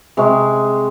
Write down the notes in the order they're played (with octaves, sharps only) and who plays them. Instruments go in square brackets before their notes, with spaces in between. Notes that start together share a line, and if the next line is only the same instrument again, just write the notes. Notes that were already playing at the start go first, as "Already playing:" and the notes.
[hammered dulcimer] C3 G#3 C#6